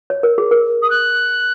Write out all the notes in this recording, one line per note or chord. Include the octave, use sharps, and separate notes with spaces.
C#5
A#4
G#4
A#4
D#6
F#6